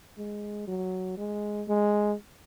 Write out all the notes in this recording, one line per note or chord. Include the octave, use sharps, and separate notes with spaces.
G#3
F#3
G#3
G#3